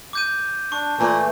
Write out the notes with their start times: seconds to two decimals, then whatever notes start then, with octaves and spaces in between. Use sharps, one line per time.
0.13 D6 G6 D#7
0.72 D4 C#6
0.99 A#2 E3 A3